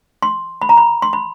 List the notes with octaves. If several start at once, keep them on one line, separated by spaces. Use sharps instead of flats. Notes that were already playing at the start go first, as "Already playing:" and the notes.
C6
B5
A#5
B5
C6
B5